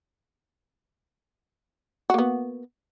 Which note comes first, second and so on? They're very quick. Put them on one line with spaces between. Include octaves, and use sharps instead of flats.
F#4 A#3 B3